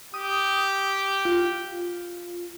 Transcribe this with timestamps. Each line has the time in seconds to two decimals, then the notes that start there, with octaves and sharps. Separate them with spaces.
0.14 G4 D#6
1.25 F4